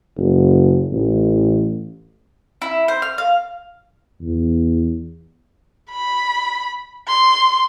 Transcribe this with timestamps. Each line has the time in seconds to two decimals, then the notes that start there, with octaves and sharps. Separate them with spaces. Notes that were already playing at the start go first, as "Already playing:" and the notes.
0.17 F#1
0.92 A1
2.62 E4
2.88 C5
3.02 F6
3.18 F5
4.22 E2
5.90 B5
7.07 C6